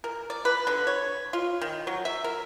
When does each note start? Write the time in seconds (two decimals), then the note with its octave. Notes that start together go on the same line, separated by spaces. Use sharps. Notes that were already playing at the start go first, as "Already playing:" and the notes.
0.04 A#4
0.30 D5
0.45 B4
0.67 D3
0.87 C#5
1.33 F4
1.61 D#3
1.87 F#3
2.05 E5
2.24 A#4